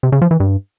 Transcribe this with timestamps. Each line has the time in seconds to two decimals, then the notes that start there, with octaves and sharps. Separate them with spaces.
0.03 C3
0.12 C#3
0.22 F3
0.31 E3
0.40 G2